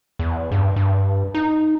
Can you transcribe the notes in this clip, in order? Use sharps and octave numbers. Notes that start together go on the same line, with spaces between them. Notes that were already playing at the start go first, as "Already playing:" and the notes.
E2
G2
G2
D#4